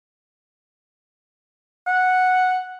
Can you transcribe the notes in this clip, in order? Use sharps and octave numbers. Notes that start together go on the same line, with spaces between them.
F#5